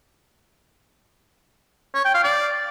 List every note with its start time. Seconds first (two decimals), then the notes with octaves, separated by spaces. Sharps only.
1.95 C#5
2.05 G5
2.15 F5
2.24 D5